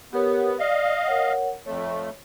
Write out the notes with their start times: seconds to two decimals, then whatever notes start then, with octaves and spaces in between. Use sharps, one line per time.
0.13 B3 G4 A#4 C#5
0.59 D5 D#5 F5
1.06 A#4 C#5 F#5
1.66 F2 A3 C#5